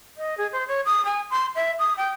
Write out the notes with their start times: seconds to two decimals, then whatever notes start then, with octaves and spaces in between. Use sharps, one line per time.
0.18 D#5
0.38 G#4
0.53 C5
0.68 C#5
0.86 D#6
1.05 G#5
1.31 C6
1.55 E5
1.79 D#6
1.97 G5